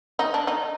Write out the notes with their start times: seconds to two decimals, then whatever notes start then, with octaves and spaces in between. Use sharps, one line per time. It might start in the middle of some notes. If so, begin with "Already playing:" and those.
0.19 D#4
0.34 D4
0.47 D#4